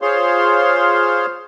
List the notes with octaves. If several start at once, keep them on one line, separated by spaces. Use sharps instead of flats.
F4 G#4 C5 C#5 F5 C6